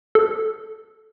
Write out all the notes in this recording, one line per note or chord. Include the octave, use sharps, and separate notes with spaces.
A4